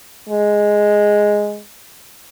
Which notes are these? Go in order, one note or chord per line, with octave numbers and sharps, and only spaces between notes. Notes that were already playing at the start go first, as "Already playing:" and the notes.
G#3